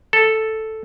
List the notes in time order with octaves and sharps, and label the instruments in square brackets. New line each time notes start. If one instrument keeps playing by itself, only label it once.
[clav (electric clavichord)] A4